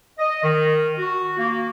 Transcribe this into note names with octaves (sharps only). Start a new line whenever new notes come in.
D#5
D#3
F#4
A#3